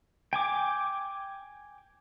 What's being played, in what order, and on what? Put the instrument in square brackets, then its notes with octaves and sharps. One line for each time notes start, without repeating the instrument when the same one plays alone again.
[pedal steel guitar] G5 G#5 D6